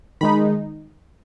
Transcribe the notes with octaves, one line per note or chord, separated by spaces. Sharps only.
D#3 G#3 D#4 B5